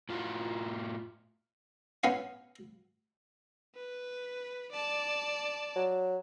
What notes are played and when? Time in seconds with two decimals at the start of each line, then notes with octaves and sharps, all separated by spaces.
0.09 A2 F4 F#4
2.04 B3 C#4 C#5 F5
3.76 B4
4.71 D5 A5
5.76 F#3